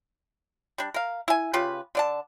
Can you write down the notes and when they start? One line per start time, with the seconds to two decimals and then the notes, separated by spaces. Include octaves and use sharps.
0.78 G3 D4
0.94 A#4 F5
1.28 E4 G#5
1.53 C#3 F4 G4 B4
1.95 D3 D5 A5